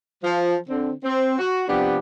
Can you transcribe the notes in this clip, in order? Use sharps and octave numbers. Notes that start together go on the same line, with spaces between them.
F3
D3 C4
C4
F#4
C3 F3 B3 D4 G4